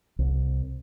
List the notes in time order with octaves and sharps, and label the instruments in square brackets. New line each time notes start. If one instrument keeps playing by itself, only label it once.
[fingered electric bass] C2